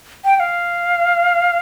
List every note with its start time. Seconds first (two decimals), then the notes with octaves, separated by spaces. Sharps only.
0.25 G5
0.36 G5
0.40 F5